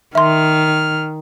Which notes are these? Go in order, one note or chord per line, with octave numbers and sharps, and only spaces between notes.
D#3 E5 C6 F6